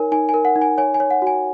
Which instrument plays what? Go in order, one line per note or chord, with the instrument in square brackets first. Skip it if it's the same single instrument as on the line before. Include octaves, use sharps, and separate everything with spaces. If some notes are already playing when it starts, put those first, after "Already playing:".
Already playing: [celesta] D#4 A#4 C#5 G#5
D#4 G#5
G#5
A#4
F#5
D#4
G#5
C#5 G#5
G#5
C#5
F#5
F#4 G#5